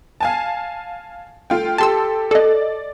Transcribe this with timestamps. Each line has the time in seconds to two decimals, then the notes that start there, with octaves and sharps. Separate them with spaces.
0.20 F5 G#5 A5
1.50 A3 F4 G5
1.78 G4 A4 A5 C6 E6
2.31 A4 D5 D#5